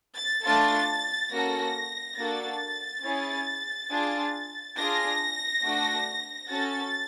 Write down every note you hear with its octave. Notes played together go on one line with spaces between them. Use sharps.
A6
A3 D4 F4 A4 A6
A#3 C#4 F#4 A4 A#6
A#3 D4 F#4 A4 A6
C#4 E4 G#4
D4 F4 G#4
D4 F4 G#4 A#6
A3 D4 F#4
C#4 F#4 A4 A6